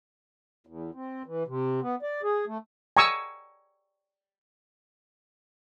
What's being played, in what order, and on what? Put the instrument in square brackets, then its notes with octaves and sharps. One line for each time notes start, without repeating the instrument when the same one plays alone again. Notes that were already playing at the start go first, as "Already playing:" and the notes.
[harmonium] E2
C4
E3
C3
B3
D5
G#4
A3
[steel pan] G#5 A#5 C#6 D#6 E6